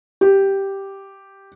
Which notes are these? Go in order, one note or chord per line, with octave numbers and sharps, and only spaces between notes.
G4